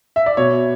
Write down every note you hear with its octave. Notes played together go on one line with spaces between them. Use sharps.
E5
D5
B2 C#5